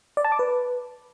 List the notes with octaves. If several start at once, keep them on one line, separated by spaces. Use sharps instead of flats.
D5
A5
D6
B4